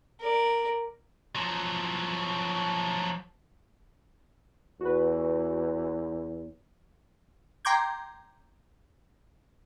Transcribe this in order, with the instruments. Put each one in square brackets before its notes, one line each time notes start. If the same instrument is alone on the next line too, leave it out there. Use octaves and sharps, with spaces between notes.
[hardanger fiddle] A#4 D5
[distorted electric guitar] F3 F#3
[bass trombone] E2 [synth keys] F#4 B4
[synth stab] G5 A#5 C6 D6 G6 G#6